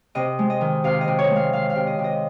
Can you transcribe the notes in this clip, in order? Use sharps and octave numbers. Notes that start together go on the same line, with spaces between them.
C3 D#5
G#3
D#5
D#3
C3 F5
D#5
C3
C#5
G#3
F5
D#3 F5
F5
C3
D#5
C3
D#5